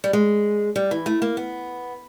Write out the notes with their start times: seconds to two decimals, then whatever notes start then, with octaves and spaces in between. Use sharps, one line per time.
0.04 G3
0.13 G#3
0.76 G3
0.91 E3
1.06 A3
1.22 A#3
1.37 B3